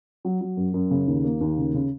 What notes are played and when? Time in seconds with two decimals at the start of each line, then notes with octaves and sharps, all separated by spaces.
0.25 F#3
0.41 F#3
0.57 F#2
0.74 F#2
0.91 C#3
1.07 D#2
1.24 A#3
1.41 D#2
1.57 C#3
1.74 C#3